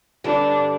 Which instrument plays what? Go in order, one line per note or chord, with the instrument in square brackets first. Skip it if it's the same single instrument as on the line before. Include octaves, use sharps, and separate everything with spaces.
[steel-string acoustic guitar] G2 D3 G3 [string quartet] D4